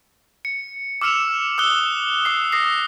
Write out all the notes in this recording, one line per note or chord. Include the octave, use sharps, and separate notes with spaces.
C#7
D6 E6 F6 C#7 E7 F7
D#6 E6 F#6 G7
D#6 C7
D#6 A#6 C7